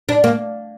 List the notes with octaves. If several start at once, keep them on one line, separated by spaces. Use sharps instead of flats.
D4
A#3